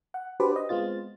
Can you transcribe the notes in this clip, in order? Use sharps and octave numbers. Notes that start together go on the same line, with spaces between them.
F#5
D4 F#4 G4 B4 C5 D5
B4 D#5
G#3 B3 C4 F4 A6